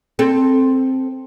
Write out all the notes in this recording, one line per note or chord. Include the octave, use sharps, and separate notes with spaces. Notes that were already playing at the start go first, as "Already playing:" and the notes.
C4 A4